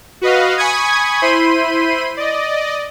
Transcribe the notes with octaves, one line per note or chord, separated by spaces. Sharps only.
F#4 B4 D#5 F5
G#5 B5 C#6 D#6 G#6
E4 C5 B5 C6 D#7
D5 D#5